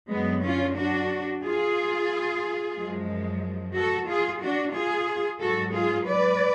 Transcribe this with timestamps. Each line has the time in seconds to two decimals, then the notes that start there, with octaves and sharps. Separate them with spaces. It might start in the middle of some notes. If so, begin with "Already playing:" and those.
0.11 F#2 D3 F#3 G#3 B3
0.44 C#4 F4
0.77 D4 F#4
1.43 F4 G#4
2.76 F#2 F3 G#3
3.75 F#4 A4
4.08 F4 G#4
4.41 D4 F#4
4.75 F4 G#4
5.40 G#2 F#3 F#4 A4
5.74 F4 G#4
6.08 B4 D5